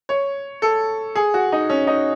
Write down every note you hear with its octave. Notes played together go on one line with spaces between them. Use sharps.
C#5
A4
G#4
F#4
D#4
C#4
D#4